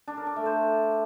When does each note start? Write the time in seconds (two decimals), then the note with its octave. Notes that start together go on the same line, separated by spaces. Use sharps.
0.08 D4
0.17 A#4
0.27 D5
0.36 A3
0.46 C5